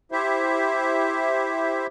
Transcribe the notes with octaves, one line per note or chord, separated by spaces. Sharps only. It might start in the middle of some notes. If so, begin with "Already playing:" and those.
E4 G4 C5 E5